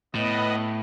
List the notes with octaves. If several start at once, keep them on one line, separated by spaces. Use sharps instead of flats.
A2 B3 B4 D#5